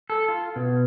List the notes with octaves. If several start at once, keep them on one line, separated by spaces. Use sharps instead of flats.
A4
F4
B2